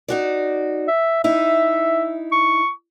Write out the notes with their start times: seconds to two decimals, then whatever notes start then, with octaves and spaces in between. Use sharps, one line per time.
0.08 D#4 F#4 D5
0.88 E5
1.24 D#4 E4 E5
2.32 C#6